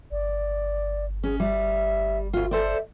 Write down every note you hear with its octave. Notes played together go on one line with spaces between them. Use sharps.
G1 D5
C#4 G#4
G3 E5
D2 F4
A4 C5 D5 E5